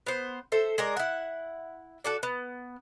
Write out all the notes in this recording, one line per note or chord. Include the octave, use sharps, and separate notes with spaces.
B3 C5
A4 C5 E5
G#3 A#4 D5
E4 F#5
F#4 A4 D5
B3